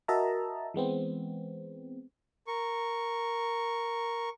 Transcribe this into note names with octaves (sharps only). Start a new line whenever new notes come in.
F#4 A#4 D#5 E5 A5 A#5
E3 G#3 B3 C4
A#4 C#6